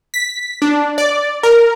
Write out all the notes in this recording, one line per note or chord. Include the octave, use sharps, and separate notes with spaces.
B6
D4
D5
A#4